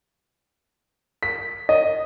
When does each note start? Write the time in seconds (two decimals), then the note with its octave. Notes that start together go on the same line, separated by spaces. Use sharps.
1.23 B6
1.69 D#5